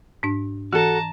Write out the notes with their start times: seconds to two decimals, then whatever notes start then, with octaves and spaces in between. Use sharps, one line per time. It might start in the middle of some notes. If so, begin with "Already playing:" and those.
0.23 G#2 D4
0.73 E3 F#4 A4 A5 A#5